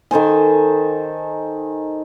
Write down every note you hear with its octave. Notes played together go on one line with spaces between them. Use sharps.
D#3 A4 C5 G#5